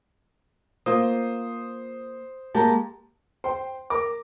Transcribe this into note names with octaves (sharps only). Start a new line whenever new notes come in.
A#3 F4 C5 D#6
G#3 A#3 G4 A5 A#5
C5 G5 C6
A#4 D6